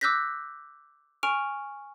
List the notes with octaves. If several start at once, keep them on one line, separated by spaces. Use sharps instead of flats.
D6 E6 F#6 G6 A#6 B6
G#5 C#6 F6 D7 F7